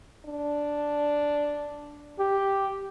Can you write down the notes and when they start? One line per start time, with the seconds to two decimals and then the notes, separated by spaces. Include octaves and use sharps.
0.26 D4
2.19 G4